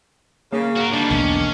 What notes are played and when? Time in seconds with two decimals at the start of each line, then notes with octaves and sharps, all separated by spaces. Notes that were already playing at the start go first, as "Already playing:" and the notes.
0.52 C#3 A#3
0.76 F#4 A#4
0.93 D3 D#3 G3 D4
1.10 B1 E2 D3 C#4